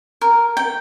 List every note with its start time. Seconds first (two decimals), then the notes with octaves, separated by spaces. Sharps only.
0.21 A#4
0.57 G5